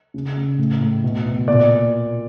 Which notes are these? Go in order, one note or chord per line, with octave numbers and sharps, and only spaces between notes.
C#3
C#3
A2
A2
B2
B2
A#2 D5